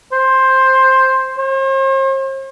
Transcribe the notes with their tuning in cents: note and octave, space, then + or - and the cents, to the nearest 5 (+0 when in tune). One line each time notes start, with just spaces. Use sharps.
C5 +10
C5 +45